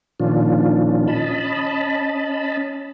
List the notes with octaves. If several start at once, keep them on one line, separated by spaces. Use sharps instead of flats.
A#2 D#3 F3 C#4 D4 F4
C#4 D#5 A5 B5